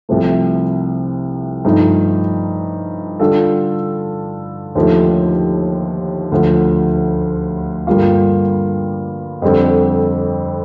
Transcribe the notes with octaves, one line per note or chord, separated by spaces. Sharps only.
C2 C3 F3 A3
G2 F3 A3 D#4
D3 G3 D4 F4 A4
D#2 D3 F3 A3
D2 D3 F3
G2 D3 G3 A#3 F4
F2 D3 G3 C4